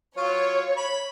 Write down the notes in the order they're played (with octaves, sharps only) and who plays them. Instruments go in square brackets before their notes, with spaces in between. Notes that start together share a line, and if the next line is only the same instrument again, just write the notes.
[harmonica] F#3 F4 C#6 [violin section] C#5
[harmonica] B5